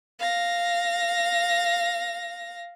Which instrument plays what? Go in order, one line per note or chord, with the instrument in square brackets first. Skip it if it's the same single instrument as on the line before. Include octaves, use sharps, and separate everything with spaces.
[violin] F5 A#6